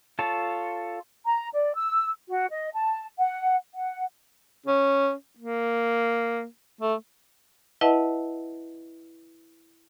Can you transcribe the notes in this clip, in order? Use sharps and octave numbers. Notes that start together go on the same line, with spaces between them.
F4 A4 C#5 A5
A#5
D5
E6
F#4
D#5
A5
F#5
F#5
C#4
A#3
A3
E4 B4 D#5 E5 F#5 A5